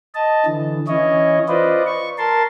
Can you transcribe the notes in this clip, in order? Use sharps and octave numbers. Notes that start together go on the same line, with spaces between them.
D#5 A5
D3 E3
E3 C#4 E4 C#5 D#5
F4 B4 C5 D5 D#5
C#6
A#4 A5 C6